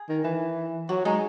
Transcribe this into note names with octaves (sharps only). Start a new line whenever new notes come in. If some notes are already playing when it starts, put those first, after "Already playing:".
Already playing: G#4
D#3
E3
F#3 F#4
G#3 D#4